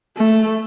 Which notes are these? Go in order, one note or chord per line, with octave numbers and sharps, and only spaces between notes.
A3